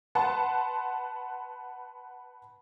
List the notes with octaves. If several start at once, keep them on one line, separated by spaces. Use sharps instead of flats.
B4 F#5 A5 C6